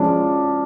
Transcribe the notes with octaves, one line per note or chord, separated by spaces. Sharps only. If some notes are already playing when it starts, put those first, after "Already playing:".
Already playing: F3 G#3 C#4 D4